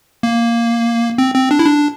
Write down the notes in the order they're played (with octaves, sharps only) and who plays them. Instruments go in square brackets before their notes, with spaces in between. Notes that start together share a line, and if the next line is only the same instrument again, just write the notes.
[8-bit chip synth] A#3
C4
C4
D4
E4
D4